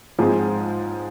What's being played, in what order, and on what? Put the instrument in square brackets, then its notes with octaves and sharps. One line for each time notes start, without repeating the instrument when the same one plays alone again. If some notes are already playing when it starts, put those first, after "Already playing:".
[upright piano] G#2 F3 G#3 C4